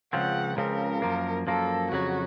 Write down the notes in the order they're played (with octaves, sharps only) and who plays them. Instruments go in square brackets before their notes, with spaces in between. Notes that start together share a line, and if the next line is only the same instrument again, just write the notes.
[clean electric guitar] C#2 C#3 F3 C4 [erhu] F#5
[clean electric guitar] C#2 C#3 F3 C4 [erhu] A#4
[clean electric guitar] F#2 F3 A#3
[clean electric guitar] F#2 F3 A#3 [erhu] A4
[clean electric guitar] F2 C#3 F#3 [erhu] F#4